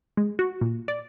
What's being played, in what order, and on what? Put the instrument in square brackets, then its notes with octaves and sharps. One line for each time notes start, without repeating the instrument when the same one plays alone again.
[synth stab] G#3
F#4
A#2
D5